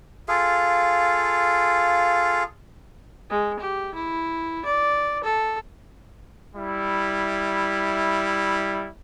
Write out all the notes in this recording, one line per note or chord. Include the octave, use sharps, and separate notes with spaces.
F4 G#4 A4 F5
G#3
G4
E4
D5
A4
G3 E4